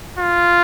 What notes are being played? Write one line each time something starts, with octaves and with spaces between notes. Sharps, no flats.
F4